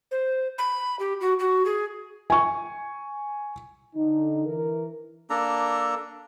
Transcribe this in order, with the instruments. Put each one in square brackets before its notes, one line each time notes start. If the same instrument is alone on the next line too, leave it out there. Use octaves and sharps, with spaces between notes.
[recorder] C5
B5
G4
F#4
F#4
G#4
[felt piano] G#5 C#6
[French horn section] D3 D#4
E3 A#4
[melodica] A#3 D4 A4 A#5